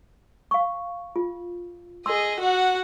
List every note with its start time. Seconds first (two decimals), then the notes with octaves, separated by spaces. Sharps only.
0.51 F5 C#6
1.16 F4
2.06 G#4 D#5 C6 E6
2.40 F#4 F#5